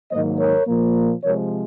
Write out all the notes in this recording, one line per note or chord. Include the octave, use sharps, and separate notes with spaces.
G#2 D#3 F#3 A#3 C5 D#5
A#4 C#5
A#2 F3 A#3
C3 F3 G#3 A#4 C#5